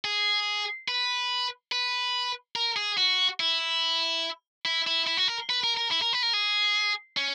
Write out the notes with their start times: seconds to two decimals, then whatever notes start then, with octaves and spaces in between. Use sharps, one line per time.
0.05 G#4
0.88 B4
1.72 B4
2.56 A#4
2.76 G#4
2.98 F#4
3.40 E4
4.65 E4
4.87 E4
5.07 E4
5.17 F#4
5.28 A#4
5.50 B4
5.64 A#4
5.77 A#4
5.91 E4
6.02 A#4
6.13 B4
6.23 A#4
6.33 G#4
7.17 C#4